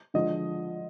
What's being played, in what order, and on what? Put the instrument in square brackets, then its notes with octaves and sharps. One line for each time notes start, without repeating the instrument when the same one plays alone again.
[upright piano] D3 F3 G#3 D#5